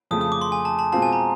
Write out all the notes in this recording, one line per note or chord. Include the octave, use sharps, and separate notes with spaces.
F2 C#3 F3 A3 D#6
D#6
D6
C6
G#5
A5
A5
B2 G#3 C4 F4 A5
G#5
A#5